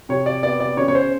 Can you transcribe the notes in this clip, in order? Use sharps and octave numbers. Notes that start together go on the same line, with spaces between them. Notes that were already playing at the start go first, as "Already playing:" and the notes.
C3 C#5
D5
B3 D5
D5
C#3 C#5
C#5
C5